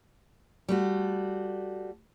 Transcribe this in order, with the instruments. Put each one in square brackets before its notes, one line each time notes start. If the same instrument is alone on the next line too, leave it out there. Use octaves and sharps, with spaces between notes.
[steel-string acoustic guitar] G3 A3 F#4